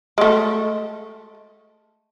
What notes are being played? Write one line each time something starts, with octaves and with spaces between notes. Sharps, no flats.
G#3 A3